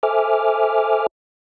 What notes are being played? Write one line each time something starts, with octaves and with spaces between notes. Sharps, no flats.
A4 C5 E5 G#5 D6 F6